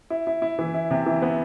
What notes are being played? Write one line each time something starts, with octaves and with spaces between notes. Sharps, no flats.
E4
E4
E4
E3
E4
C3
E3
B3